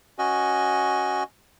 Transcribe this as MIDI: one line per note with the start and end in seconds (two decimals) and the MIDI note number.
0.19 1.23 61
0.19 1.23 66
0.19 1.23 75